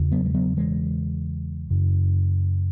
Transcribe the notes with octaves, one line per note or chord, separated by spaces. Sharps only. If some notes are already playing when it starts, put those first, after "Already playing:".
Already playing: E2 C#3
F#3 B3
G#3
F#3 B3
E3 G#3
F#2 C#3